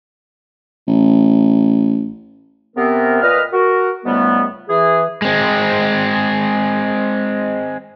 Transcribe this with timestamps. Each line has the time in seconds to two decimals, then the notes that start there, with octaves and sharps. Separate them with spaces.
0.88 A1
2.76 C3 B3 C4 A#4
3.22 A#2 B4 D#5 F6
3.52 F#4 A#4
4.05 C#2 G#2 G3 A3 B3
4.69 E3 G#4
5.22 G#3 C4